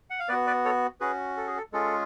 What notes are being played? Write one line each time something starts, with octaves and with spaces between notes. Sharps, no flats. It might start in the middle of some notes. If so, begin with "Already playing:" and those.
F#5
F5
B3 F#4 B4 D5
B4 D5
A4 C#5
C#4 F#4 G#4 B4
A4
G#4
A4
G#3 C#4 F4 G#4 A4